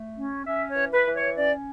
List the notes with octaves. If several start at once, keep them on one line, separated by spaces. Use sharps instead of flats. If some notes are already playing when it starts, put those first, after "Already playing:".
Already playing: A3
C#4
C#4 E5
C#5
E3
B4
E3
C#5
C#4 D5